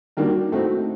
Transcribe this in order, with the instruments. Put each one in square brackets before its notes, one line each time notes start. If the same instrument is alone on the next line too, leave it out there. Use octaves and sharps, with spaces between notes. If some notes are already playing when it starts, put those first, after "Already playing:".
[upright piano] D#3 G3 A#3 D4 F#4
A2 A3 C4 D#4 F#4